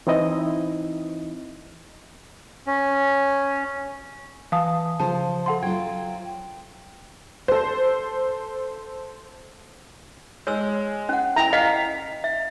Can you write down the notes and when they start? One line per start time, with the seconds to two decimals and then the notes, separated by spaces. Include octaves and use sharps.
0.07 E3 C4 D#4 E4 D#5
2.67 C#4
4.52 E3 F5 A5 D#6
5.00 C#3 F3 F4 C5 A5
5.46 A4 F#5 C6
5.63 F#3 F4 G5 G#6
7.48 A4 C5
10.47 G#3 C#5 E6
11.09 C#4 F#5
11.36 E4 G5 A#5
11.53 D#5 F5 B6
12.24 E5